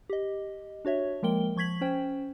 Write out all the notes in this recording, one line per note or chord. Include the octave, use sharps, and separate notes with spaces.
G4 D#5
D4 F#4 C#5 E5
F3 G#3 A#3 A#4 G5 G7
F3 C#6 G#6 B6 F#7
C#4 C5 G5